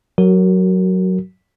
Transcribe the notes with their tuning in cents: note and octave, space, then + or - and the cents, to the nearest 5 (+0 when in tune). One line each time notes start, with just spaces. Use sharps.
F#3 +0 F#4 +25 A#4 -10